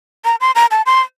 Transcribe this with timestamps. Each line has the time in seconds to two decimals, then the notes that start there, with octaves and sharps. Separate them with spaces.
0.25 A#5
0.40 C6
0.55 A#5
0.71 A5
0.86 C6